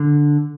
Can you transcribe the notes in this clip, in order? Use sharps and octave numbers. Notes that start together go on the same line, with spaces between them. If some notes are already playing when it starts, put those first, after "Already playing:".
Already playing: D3